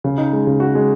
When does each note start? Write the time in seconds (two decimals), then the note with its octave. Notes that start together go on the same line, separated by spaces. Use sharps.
0.04 C#3
0.18 D#4
0.33 G#3
0.47 C#3
0.60 F#4
0.75 G#3